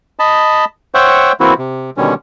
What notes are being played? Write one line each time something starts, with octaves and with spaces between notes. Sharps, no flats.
D#5 A5 B5
C5 C#5 E5 F#5 G5
E3 A#3 C4 E4 F#4
C3
B2 D3 D#3 G3 C#4